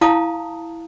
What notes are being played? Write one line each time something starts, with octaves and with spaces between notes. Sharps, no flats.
E4 F5 A5 A#5 D#6